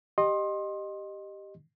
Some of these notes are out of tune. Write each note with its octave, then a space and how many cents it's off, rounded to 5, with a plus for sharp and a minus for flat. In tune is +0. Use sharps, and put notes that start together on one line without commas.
G4 +0 D#5 -15 C6 +25